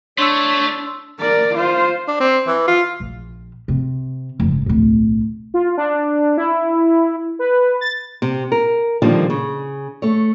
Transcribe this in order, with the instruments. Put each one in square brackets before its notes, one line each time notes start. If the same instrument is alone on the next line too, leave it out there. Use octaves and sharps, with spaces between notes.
[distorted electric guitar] A3 [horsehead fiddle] D4 [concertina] C#5 [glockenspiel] C6 E6
[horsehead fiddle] A#4 D5
F4 C5
[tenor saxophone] D4
C4
E3
F4
[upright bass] A#1
C3
F#1 G#2
D1 B1
[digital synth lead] F4
D4
E4
B4
A6
[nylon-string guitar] C3
A#4
A#2 D3 D#3 F3 G3
C#3
A3 C#5